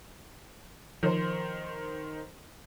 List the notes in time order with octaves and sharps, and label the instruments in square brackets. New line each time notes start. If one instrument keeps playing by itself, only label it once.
[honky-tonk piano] D#3 C5 [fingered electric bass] F3